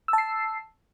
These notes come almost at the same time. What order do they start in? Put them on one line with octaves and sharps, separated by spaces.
E6 A5 C7